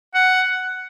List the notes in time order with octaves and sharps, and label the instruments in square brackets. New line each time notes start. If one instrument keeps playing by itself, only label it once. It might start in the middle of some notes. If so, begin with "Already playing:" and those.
[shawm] F#5